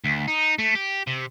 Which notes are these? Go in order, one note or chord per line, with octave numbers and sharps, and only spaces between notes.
D2
D#4
A3
G4
C3